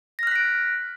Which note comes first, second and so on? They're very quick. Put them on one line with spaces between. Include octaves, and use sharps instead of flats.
A#6 F6 F#6 B6 D7